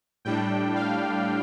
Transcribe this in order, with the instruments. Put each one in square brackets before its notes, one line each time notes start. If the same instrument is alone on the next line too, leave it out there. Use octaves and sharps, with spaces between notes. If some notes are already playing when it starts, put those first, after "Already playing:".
[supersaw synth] A2 G3 D4 G5
F5